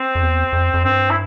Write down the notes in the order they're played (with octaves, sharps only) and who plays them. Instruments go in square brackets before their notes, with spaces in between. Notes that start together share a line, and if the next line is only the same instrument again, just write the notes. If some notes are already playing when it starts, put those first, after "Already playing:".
Already playing: [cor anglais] C4
[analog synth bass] F2
E2
F2
F2
[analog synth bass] G2 [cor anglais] C4
[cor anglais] E4